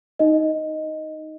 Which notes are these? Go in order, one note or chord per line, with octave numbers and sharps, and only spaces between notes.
D#4 D#5